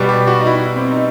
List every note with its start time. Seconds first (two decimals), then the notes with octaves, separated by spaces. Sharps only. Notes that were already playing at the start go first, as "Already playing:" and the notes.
Already playing: B2 G3 B3
0.09 G4
0.27 F#4
0.41 D#4
0.47 E4
0.76 C4
0.91 D#4